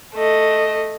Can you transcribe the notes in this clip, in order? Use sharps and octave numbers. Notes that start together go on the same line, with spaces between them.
A3 D#5